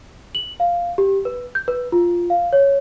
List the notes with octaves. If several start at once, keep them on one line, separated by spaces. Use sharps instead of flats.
F#7
F5
G4
B4
G6
B4
F4
F5
C#5